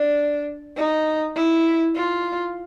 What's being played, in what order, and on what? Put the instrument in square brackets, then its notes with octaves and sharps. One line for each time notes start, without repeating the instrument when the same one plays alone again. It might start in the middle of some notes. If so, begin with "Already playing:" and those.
Already playing: [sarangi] D4
D#4
E4
F4